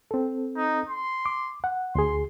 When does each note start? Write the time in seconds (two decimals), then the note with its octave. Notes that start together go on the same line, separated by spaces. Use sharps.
0.11 C4 A4
0.57 D#4
0.89 C6
1.26 D6
1.64 F#5
1.95 D2 G#4 C6